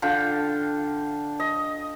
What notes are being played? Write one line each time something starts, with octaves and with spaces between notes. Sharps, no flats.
D3 F4 G5
D#5